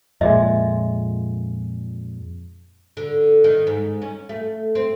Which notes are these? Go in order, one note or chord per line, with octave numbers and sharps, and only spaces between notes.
F2 A#2 G#3 D#5 E5
D3
D#3
G#2
C#4
A3
C4